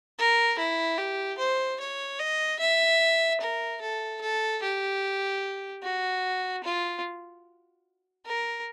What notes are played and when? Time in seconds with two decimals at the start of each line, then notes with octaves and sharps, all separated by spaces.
0.18 A#4
0.59 E4
0.98 G4
1.39 C5
1.80 C#5
2.19 D#5
2.60 E5
3.41 A#4
3.81 A4
4.21 A4
4.62 G4
5.83 F#4
6.64 F4
8.26 A#4